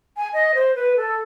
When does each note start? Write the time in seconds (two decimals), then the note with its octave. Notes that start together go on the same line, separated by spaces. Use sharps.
0.17 G#5
0.34 D#5
0.55 C5
0.75 B4
0.97 A4